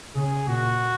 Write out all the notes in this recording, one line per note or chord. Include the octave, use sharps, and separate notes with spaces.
C#3 G#4
A#2 F#4